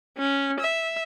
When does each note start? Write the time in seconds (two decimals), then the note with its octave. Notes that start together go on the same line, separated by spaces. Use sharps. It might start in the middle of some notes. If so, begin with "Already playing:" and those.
0.18 C#4
0.60 E5